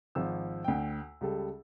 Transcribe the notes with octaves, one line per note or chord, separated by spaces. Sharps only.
G#1 F3 E6
D2 G5
C#2 G3 A4